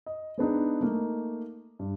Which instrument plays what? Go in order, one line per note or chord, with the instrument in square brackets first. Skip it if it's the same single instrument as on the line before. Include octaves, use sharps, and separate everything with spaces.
[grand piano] D#5
G#3 B3 D4 D#4
A3 A#3 D#4
G2